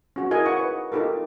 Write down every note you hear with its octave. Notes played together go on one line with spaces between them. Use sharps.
C#4 F#4
E4 G#4 A#4 D#5 G#5
D#4 C#5 F#5 C#6
B4
D#4 F4 G4 A4 A#4